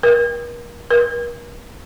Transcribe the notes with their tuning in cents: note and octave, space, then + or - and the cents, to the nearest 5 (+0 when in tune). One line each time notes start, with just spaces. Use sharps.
A#4 +40
A#4 +45